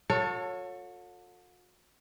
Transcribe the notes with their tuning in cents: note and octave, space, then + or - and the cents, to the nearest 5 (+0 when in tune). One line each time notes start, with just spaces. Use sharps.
F#4 -45 A4 +25 C#5 +0